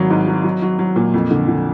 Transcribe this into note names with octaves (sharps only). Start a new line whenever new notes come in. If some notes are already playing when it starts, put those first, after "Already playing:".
Already playing: G#1 F#3
G#2
F#3
F#3
F#3
F#3
A#2
F2
D3
D3